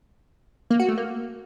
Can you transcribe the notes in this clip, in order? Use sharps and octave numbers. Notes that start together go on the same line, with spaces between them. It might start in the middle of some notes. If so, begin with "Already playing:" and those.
A#3
F#4
A3
A#3